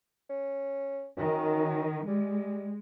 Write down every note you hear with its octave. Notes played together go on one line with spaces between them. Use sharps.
C#4
F#2 D#3
G3 G#3